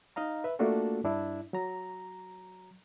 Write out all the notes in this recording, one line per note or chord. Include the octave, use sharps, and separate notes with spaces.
D#4 D#5 F5 A#5
B4 E5
A3 A#3 D4 F4 F#4 A4
G2 D4 E4
F#3 A#5